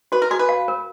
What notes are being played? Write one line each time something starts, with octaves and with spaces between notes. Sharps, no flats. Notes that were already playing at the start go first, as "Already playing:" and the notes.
F#4 B4
A#4
F#4 G#4
B4
F5
A#4